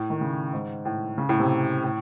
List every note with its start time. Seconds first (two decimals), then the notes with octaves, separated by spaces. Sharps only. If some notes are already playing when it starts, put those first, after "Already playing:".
Already playing: A2
0.10 D#3
0.21 C#3
0.53 G#2
0.85 A2
1.18 C#3
1.29 A2
1.40 C3
1.84 A2